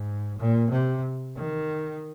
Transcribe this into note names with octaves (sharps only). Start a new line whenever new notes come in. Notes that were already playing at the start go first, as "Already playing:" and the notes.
Already playing: G#2
A#2
C3
D#3